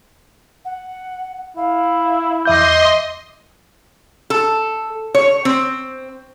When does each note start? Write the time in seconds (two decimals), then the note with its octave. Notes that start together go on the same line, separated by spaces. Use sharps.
0.65 F#5
1.57 E4 F5
2.45 E2 D#5 E5 C6 D6 G6
4.30 A4
5.15 C#5
5.45 C4